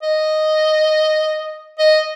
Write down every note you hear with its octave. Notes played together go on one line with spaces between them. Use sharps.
D#5
D#5